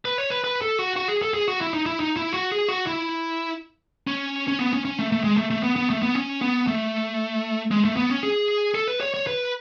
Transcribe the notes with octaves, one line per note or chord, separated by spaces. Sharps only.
B4
C#5
B4
B4
A4
F#4
F#4
G#4
A4
G#4
F#4
E4
D#4
E4
D#4
E4
F#4
G#4
F#4
E4
C#4
C#4
B3
C#4
C#4
A3
A3
G#3
A3
A3
B3
B3
A3
B3
C#4
B3
A3
G#3
A3
B3
C#4
G#4
A4
B4
C#5
C#5
B4